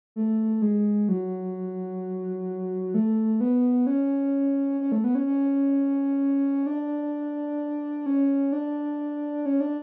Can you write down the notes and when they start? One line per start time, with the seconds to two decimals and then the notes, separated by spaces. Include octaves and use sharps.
0.16 A3
0.62 G#3
1.09 F#3
2.94 A3
3.41 B3
3.87 C#4
4.81 C#4
4.92 A3
5.04 B3
5.15 C#4
5.26 C#4
6.66 D4
8.06 C#4
8.52 D4
9.46 C#4
9.60 D4